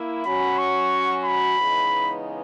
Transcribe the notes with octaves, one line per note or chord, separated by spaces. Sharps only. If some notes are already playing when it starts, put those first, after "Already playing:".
Already playing: A#3 E4
F#3 C#4 F#4 B5
C#6
B5
C#3 E3 G#3 B3 D#4